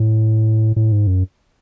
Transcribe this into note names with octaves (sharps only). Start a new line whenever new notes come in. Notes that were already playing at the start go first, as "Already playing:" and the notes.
Already playing: A2
A2
G#2
F#2